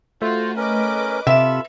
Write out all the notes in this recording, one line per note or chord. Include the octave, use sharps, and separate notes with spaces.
A3 F4 F#4 C5
C#4 A#4 B4 D#5 D6
C3 F4 A4 E5 B5 E7